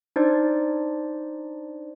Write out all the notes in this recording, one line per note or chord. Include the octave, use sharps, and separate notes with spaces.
D4 D#4 C5 D5